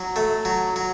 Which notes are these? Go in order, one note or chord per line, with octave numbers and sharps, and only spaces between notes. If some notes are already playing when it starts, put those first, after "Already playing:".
Already playing: F#3
A3
F#3
F#3